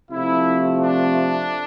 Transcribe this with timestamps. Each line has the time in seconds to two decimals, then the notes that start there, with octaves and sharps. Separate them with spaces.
0.11 C3 F3 A3 E4
0.82 D4